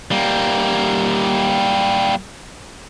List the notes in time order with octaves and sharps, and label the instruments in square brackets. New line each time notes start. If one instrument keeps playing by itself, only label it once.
[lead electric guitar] G3 A#3